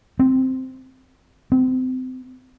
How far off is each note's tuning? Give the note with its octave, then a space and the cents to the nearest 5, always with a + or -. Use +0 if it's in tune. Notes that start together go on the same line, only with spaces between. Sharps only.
C4 -5
C4 -30